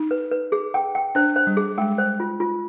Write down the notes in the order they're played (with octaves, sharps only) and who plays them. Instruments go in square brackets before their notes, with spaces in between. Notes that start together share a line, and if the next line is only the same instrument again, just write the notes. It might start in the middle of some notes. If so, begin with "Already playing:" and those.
Already playing: [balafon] D#4
[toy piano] B4
B4
G#4
G5
G5
[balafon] D4 [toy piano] C5
[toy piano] C5
[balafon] G3
[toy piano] G#4
[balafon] G#3 [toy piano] G5
[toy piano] C5
F4
F4